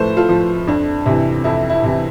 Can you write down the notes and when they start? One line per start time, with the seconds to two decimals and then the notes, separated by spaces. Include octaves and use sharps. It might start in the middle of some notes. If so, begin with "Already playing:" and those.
Already playing: A2 F3 A4 B4 C5
0.17 F4 A4
0.29 F3
0.67 F2 D4
1.06 C3 E3
1.44 F2 E4
1.70 E4
1.84 C3 E3